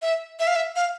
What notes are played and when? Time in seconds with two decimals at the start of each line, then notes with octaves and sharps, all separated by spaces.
0.02 E5
0.40 E5
0.47 F5
0.56 E5
0.76 F5